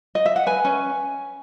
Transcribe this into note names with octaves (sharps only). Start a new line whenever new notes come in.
D#5
E5
F#5
B4 G#5
C#4